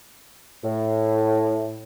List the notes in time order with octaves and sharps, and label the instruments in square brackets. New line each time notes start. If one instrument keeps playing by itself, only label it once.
[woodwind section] A2